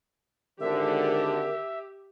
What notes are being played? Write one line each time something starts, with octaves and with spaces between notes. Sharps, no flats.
G#1 D3 G4 A#4 E5